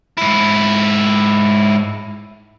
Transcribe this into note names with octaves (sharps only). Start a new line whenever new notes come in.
G#2 E4